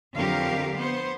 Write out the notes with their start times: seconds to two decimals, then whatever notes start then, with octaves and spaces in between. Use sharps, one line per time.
0.16 F2 D3 F#3 G4 A#4 F5
0.76 B3 C5